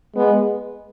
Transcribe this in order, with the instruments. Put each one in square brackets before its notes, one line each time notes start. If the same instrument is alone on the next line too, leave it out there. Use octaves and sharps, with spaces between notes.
[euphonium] G#3 [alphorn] B3